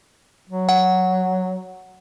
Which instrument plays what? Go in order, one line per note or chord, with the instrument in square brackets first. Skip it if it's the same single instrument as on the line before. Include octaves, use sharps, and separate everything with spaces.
[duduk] F#3
[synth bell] F#5